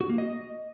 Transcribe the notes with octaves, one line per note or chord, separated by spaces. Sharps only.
F#4
A#3
D#5